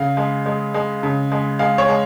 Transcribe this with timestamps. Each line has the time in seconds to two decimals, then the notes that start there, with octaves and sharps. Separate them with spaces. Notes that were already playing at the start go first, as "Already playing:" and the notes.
Already playing: C#3 F5
0.17 G#3
0.46 G#3
0.74 G#3
1.03 C#3
1.32 G#3
1.59 G#3 F5
1.78 C#5
1.88 G#3